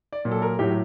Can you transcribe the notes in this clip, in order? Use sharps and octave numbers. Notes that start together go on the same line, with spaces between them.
D5
A#2 F#3
A4
A#4
A2 F#3 G4